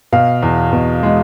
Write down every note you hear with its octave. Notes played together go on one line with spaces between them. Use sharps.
B2 F5
E2
B2
G#3